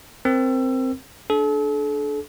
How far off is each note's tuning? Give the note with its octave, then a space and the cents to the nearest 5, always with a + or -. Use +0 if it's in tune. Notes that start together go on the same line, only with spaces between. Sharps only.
C4 +0 A#4 +0 E6 +25
D4 +0 A4 -40